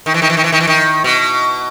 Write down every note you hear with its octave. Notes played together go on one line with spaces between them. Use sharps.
D#3
E3
D#3
E3
D#3
E3
D#3
E3
D#3
B2